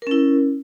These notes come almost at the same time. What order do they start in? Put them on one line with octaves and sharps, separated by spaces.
A#4 C#4 E4